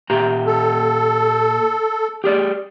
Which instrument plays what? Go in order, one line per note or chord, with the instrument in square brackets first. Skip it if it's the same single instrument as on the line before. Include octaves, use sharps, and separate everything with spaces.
[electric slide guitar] A#2 G4 A#5
[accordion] A4
[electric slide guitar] G4 G#4 D5